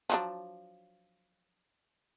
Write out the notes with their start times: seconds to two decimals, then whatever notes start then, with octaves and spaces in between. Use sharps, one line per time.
0.10 F3 F#3 D4